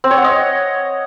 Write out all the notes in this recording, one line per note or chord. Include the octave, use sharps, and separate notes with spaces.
C4
C#5
F#5
D#5